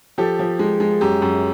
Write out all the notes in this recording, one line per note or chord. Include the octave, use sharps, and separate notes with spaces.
F3 G4 A4
F3
G#3
G#3
F#2 G4
F#2